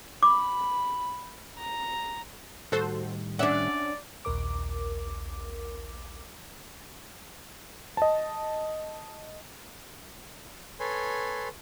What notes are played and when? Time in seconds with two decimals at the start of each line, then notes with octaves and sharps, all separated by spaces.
0.23 B5 D6
1.57 A#5
2.72 A2 D#3 G3 F#4 A4 C5
3.39 C#4 D4 D5 E5 F#5
4.25 A#1 D#2 A#4 D6
7.97 D#5 A5
10.80 A4 B4 C#5 G#5 C6